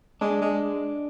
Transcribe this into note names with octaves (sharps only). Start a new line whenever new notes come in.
G#3 D4
G#3